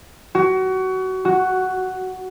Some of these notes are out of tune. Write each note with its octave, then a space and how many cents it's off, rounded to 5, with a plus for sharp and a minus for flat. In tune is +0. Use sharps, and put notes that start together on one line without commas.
F#4 +25
F#4 +5